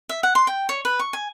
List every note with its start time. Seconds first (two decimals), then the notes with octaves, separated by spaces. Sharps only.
0.09 E5
0.23 F#5
0.35 C6
0.47 G5
0.69 C#5
0.85 B4
0.99 C#6
1.13 G#5